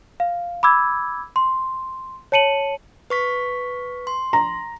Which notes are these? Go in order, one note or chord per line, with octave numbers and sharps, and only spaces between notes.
F5
B5 D6 E6 G#6
C6
C#5 A5 C#7 D#7 F#7
B4 C#6 B6
C6
A#5